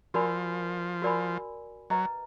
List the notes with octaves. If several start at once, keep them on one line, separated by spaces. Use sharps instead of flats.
F3 F#4 A#4 D5 G#5 B5
F#4 A#4 D5 G#5 B5
F#3 B4 D#5 A#5